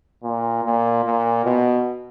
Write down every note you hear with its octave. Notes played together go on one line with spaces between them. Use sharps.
A#2
A#2
A#2
B2